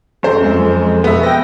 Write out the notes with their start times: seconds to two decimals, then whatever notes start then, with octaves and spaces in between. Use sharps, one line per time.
0.23 F#2 A4 C5
0.41 F2 G#3
1.04 B2 B3 E5
1.23 G5 A#6